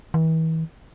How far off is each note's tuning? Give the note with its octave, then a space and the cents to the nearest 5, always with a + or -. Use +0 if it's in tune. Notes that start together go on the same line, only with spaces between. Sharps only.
E3 -40